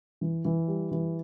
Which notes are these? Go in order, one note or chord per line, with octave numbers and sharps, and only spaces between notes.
E3
E3
G3
E3